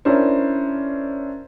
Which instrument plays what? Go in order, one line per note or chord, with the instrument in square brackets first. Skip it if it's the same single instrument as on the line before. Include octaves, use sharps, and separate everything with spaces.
[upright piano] C#4 D4 E4 A#4 C5